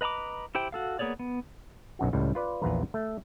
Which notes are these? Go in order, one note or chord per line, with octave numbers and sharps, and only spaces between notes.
B4 D#5 A#5 B5 D6
E4 G4 C5 G5
F#4 A4 F5
A#3 B3 G#4 C#5 D5
B3
B1 F#2 F#4
C#2 A2 G3
F4 B4 D5
A#1 E2 F4 B4 A#5
A3